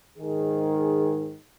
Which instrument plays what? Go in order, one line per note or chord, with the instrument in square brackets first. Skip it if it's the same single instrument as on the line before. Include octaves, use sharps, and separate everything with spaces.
[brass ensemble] G#2 D#3 G#4